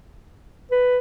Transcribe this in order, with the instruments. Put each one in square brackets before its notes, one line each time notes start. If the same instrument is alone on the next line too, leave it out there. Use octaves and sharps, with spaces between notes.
[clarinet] B4